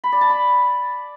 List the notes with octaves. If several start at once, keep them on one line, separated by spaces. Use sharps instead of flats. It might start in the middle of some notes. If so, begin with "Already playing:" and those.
B5
D5
A5
B5